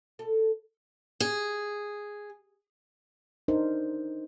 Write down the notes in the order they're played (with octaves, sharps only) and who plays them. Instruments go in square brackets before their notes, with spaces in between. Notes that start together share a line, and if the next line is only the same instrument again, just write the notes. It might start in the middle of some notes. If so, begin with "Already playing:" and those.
[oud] A4
[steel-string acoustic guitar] G#4
[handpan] D4 D#4 A#4 C5